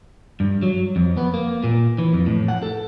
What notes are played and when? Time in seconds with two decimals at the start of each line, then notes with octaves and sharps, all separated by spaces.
0.40 G2
0.62 F#3
0.96 F2
1.17 B3
1.34 A#3
1.64 A#2
1.98 E3
2.13 F2
2.26 A2
2.48 F#5
2.63 A4